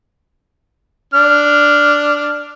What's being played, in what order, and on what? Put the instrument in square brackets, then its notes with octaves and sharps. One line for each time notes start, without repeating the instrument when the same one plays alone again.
[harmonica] D4 F6